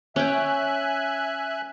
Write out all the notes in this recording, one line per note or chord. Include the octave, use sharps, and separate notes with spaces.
C#4 E5 G5 G#5 F#6